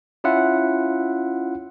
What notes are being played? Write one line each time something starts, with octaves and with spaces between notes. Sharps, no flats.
C#4 E4 F4 E5 F#5